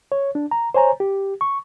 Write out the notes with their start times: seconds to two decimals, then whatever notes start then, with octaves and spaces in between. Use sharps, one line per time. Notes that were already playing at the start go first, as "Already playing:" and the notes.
0.12 C#5
0.35 D4
0.51 A#5
0.74 C5 C#5 G#5 A#5
1.00 G4
1.41 C#6